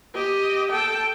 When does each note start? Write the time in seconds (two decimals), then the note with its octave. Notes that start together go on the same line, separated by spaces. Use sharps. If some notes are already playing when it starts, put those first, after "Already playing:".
0.15 G4 D#5
0.71 A4 G5